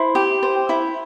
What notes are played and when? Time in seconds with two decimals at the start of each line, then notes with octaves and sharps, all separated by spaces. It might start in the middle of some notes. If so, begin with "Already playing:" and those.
Already playing: E4 C5
0.15 G4
0.43 C5
0.69 E4